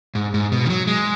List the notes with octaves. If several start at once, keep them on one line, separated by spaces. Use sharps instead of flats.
G#2
G#2
B2
D#3
F#3
G#3